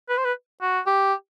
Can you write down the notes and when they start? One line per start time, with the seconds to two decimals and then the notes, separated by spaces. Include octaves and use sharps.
0.09 B4
0.17 C5
0.25 B4
0.62 F#4
0.87 G4